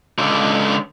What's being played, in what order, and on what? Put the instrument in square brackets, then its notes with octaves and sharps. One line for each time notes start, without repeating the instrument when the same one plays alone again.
[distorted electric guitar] C#2 D3